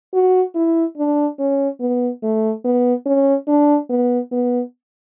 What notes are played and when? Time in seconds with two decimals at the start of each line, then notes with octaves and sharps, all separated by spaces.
0.14 F#4
0.55 E4
0.97 D4
1.39 C#4
1.80 B3
2.23 A3
2.65 B3
3.06 C#4
3.48 D4
3.90 B3
4.32 B3